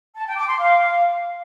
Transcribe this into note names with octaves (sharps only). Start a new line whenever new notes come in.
A5
G5
D6
C6
F5